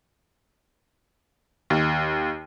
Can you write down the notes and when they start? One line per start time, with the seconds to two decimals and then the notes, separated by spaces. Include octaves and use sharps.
1.70 D#2